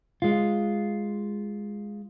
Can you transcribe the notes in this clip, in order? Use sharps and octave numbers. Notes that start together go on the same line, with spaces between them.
G#3 F4